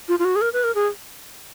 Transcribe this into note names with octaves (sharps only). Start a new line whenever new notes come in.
F4
F4
F#4
G#4
A#4
B4
A#4
G#4